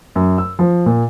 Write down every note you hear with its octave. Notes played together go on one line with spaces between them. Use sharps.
F#2
E6
F3
A#2